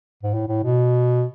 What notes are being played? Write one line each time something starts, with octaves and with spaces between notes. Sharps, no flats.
G#2
A2
A2
B2